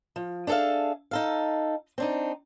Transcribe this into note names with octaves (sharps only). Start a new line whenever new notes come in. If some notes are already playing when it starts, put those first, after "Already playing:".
F3
D4 G#4 A4 E5 F5
D#4 A4 F5
C4 D4 D#4